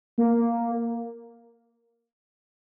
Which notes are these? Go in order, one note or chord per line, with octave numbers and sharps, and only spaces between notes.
A#3